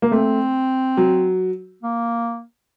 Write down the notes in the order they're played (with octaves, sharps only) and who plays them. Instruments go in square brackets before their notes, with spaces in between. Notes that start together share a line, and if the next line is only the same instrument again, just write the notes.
[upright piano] A#3
[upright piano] A3 [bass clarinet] C4
[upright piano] F#3
[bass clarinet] A#3